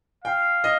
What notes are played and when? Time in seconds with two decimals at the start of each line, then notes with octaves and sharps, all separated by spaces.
0.24 F5 G5
0.64 D#5